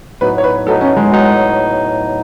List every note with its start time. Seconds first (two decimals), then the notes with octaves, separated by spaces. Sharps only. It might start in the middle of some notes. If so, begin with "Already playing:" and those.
0.21 A2 F#3 B3 D#4 B4
0.38 C#5
0.44 B4
0.66 A2 F#3 B3 D#4 A4
0.81 C#4
0.97 G#3
1.11 A2 F#3 B3 D#4